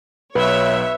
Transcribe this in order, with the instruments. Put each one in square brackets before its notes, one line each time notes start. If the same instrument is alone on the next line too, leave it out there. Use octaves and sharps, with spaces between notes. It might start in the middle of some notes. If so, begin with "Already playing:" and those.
[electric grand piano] B1 [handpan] B4 [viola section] C#5 E5